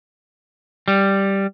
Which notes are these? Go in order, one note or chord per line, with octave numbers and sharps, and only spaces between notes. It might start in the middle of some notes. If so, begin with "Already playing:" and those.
G3